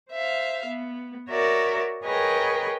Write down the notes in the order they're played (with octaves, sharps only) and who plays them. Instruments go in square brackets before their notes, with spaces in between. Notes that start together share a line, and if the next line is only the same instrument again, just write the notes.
[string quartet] C5 E5 F5
B3
F#4 A#4 C#5 D5 E5
G#4 A#4 B4 C#5 D#5 G5